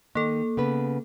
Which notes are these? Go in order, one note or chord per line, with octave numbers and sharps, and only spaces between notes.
D#3 A#3 A4
C#3 B3 B4